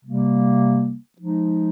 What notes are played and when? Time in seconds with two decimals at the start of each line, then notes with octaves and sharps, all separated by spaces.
0.04 C3 G3 A#3
1.19 F3 G#3 D#4